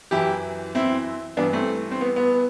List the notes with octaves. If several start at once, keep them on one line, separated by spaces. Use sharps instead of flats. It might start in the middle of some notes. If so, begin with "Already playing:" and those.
F#2 E3 E4 G4
C4 E4
G2 E3 B3 D4
A3 C4
C4
B3
B3